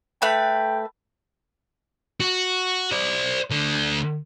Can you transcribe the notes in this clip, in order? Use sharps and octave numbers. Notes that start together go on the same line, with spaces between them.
A3 B4 G5 B5
F#4
C5 D5
D2 D3